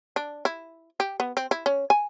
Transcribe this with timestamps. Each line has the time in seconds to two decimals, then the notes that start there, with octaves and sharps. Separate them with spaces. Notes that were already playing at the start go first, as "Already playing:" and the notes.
0.16 D4
0.45 E4
1.00 G4
1.20 B3
1.37 C4
1.51 E4
1.66 C#4
1.90 G#5